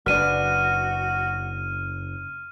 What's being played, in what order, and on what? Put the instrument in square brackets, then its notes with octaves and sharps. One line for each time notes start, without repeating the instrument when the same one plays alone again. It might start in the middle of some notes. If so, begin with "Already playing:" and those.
[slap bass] F#1 [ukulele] D4 B4 [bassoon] F#4 [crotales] F6 D#7